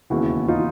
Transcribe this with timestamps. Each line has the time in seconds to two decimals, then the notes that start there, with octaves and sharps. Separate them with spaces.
0.10 E1 D#2 C#3 E4 F#4
0.48 D#4 F4